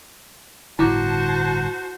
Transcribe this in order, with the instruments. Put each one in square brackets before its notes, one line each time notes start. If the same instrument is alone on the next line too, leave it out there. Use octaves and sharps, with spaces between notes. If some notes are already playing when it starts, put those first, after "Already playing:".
[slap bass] G1 A2 D3 [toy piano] E4 D6 [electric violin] F#4 C5 [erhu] A5